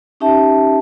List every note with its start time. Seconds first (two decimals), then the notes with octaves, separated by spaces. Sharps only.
0.20 C#4 D#4 G4 E5 A5